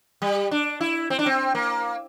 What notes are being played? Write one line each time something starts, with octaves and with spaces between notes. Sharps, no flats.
G3
D4
E4
C4
D4
C4
A#3